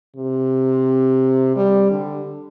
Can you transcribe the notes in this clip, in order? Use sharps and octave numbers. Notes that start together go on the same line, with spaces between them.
C3
G3
D3